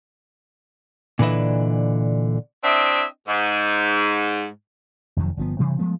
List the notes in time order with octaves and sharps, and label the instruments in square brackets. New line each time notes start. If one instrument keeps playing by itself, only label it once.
[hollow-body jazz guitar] A#2 D3 E3 B4 D#5 E5
[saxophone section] C4 D4 E4 D#5 E5
G#2
[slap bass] F1 F2 D#3 F#3
G1 F3 B3
G2 C3 E3 G3
F3 G#3 A3 B3